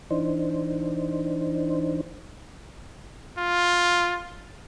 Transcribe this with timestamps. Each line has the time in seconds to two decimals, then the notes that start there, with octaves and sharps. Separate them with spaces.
0.11 E3 D4 D#4 C5
3.38 F4